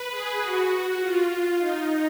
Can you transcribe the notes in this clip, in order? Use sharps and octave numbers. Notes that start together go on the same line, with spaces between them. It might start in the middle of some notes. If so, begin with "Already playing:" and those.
Already playing: B4
G#4
F#4
F#4
F4
D#4